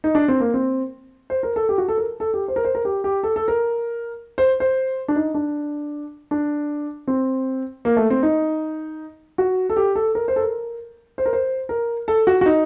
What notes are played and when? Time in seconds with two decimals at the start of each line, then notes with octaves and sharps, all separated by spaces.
0.04 D#4
0.15 D4
0.28 C4
0.40 A#3
0.54 C4
1.30 C5
1.43 A#4
1.56 A4
1.69 G4
1.78 F#4
1.88 A4
1.98 A#4
2.20 A4
2.34 G4
2.48 C5
2.56 A#4
2.65 C5
2.75 A#4
2.85 G4
3.04 G4
3.23 A4
3.36 A4
3.48 A#4
4.38 C5
4.60 C5
5.08 D4
5.16 D#4
5.34 D4
6.31 D4
7.08 C4
7.85 A#3
7.97 A3
8.10 C4
8.23 D#4
9.38 F#4
9.70 A4
9.77 G4
9.96 A4
10.15 A#4
10.28 C5
10.36 A4
10.40 A#4
11.18 C5
11.26 A#4
11.33 C5
11.69 A#4
12.08 A4
12.27 F#4
12.41 F#4
12.46 D#4